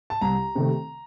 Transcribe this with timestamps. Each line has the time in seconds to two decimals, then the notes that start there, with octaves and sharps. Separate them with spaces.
0.10 A5
0.21 C2 A#5
0.55 C3 D#3 A3